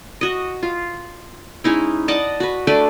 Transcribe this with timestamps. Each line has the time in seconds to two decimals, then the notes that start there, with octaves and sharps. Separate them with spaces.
0.21 F#4 D#5
0.63 F4
1.64 G#3 C#4 D#4 E4
2.08 D5 D#5 F#5 A5
2.40 F#4 B4
2.67 A3 D4 B4 D5